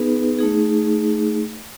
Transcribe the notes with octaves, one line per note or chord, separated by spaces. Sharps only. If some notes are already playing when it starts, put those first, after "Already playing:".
Already playing: B3 D#4 G#4 B4
A3 D#4 G#4